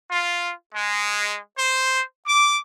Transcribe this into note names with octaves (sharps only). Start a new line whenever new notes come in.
F4
G#3
C5
D6